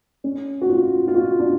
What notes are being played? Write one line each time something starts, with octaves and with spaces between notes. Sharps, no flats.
C#4
F#4
F4
F4
F#4
D4